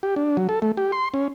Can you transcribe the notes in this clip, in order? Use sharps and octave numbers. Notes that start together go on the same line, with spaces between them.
G4
D4
F#3
A4
A3
G4
C6
C#4